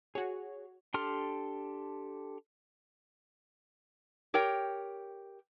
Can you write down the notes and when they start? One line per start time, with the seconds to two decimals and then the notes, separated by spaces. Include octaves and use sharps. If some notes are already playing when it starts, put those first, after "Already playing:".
0.15 F#4 G#4 C#5
0.94 D4 G4 A4 C6 F6
4.34 G4 A#4 C#5 G5